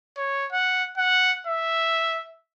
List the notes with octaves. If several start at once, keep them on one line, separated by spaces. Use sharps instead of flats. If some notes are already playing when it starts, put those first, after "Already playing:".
C#5
F#5
F#5
E5